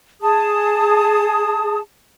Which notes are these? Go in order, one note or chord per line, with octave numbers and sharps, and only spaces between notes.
G#4 A5 D#6